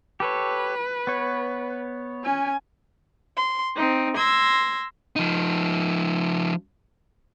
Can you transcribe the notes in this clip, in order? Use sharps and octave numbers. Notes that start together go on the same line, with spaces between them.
G4 A4 B4 C#5
B3 C#5
C#4 G#5
C6
C4 D#4
C6 E6 G#6 A#6
F3 D#4